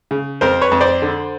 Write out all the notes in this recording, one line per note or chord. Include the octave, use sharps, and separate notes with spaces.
C#3
F2 A#4 C5
B4 C#5
F2
C5 D5
D3